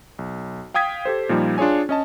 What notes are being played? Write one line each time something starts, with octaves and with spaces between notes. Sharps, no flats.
B1
F5 G5 D#6 G#6 B6
G4 A4 C5
A#2 F3 G3 A#3 D#4
D4 F4 G#4 C#5 G#5
C#4 D#5 A5